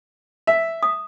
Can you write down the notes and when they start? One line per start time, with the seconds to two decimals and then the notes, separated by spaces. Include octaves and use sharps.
0.47 E5
0.83 D#6